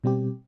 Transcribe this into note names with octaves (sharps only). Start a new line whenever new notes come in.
B2 G3 C4 G4